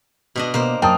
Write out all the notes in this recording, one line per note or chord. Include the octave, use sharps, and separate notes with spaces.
B2 D4 D#5
B2 A#3 C5
F#2 A#3 G5 A5 D#6